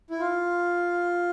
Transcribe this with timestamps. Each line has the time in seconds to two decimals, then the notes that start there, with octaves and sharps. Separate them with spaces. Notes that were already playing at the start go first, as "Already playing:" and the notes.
0.10 E4
0.20 F4